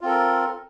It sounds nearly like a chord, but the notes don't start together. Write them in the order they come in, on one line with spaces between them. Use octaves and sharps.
F4 C4 A4 A#4